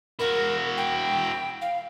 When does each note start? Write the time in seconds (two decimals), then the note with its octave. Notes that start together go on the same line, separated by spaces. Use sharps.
0.19 E4 F#4 A#4
0.77 G5
1.61 F5